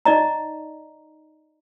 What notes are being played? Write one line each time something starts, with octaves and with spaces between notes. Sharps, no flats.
D#4 D5 D#5 A#5